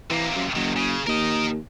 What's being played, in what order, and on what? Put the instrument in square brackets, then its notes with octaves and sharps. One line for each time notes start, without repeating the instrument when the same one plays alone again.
[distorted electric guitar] C3 A#3 [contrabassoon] E3
[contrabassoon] F#2
[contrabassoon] F#1 [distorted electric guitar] D#3 F#3
[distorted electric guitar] C#3
[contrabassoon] D#2 [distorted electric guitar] A#4 D#5